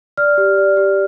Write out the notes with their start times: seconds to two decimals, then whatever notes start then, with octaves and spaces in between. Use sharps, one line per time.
0.17 D5 F6
0.38 G4
0.58 D5
0.77 G4